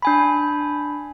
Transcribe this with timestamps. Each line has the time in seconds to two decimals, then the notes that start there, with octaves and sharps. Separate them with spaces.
0.02 D4 G#5 B5